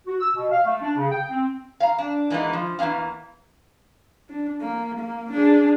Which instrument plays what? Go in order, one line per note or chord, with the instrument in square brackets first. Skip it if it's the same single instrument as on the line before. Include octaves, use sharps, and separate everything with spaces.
[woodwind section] F#4
E6
B2
F5
A3
D4
C#3
G5
C4
[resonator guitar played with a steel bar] F5 A#5
D4
E3 G#3 A#3 B3 D#4
F3
E2 E3 A#3 D4 F5
[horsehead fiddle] D4
A#3
A#3
D4 G#4